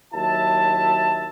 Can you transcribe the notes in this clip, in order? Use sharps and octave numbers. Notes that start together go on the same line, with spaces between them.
D#2 F#3 E4 E5 A5